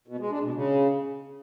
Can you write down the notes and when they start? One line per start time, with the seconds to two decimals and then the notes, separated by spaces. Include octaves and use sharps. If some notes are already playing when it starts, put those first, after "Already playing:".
0.08 B2
0.19 G#3
0.31 D4
0.43 B2
0.54 C#3